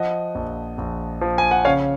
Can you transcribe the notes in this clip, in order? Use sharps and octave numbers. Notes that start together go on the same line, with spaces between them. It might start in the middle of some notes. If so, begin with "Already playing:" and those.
Already playing: F3 D#5 F#5
A#1
A#1
F3
G#5
F#5
C#3 C#5 F5